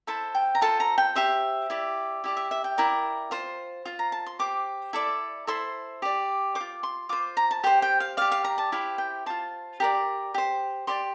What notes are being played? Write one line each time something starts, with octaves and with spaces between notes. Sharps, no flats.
E4 A4 C5 A5
G5
A#5
F4 A4 C5 A5
A#5
G5
G4 C5 E5
E4 G4 D5
E4 G4 D5
E5
E5
G5
E4 A#4 D5
F4 C5
F4 C5
A#5
A5
C6
G4 C5 D6
E4 A4 D5
E4 A4 C5 C6
G4 D5
C5 D6
F4
C6
F4 C5 D6
A#5
A5
G4 C5 G5
G5
F5
G4 D5 F5
F5
A#5
A5
E4 G4 C5 F5
G5
F4 C5 A5
G4 A#4 D5
G4 C5
G4 D5 C6